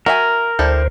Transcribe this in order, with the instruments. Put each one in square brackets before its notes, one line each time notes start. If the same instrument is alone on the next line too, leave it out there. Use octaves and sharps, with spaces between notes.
[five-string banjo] F#4 E5 G#5 [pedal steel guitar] A#4
[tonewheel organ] D2 C5 [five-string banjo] G3 E4 A4